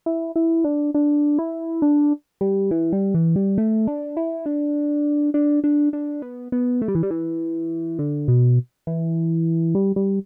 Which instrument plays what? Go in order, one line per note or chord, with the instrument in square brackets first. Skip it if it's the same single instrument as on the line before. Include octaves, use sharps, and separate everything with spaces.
[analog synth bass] E4
E4
D4
D4
E4
D4
G3
E3
G3
E3
G3
A3
D4
E4
D4
D4
D4
D4
B3
B3
A3
G3
E3
G3
E3
D3
B2
E3
G3
G3